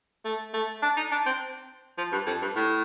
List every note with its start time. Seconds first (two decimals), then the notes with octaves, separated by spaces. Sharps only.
0.25 A3
0.54 A3
0.82 D4
0.97 D#4
1.11 D4
1.26 C4
1.98 F3
2.12 G2
2.26 F2
2.42 G2
2.56 A2